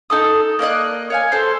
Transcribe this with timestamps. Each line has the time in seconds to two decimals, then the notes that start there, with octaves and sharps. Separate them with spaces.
0.10 D#4 A4 D#6
0.59 A#3 D5 D#5 F#6
1.10 C#5 F5 G#5
1.32 A4 C5